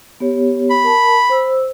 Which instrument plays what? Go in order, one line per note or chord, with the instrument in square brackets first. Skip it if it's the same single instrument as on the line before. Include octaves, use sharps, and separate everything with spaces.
[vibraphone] B3 G4 C#5
[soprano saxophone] B5
[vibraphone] A#4 A5
C5 E6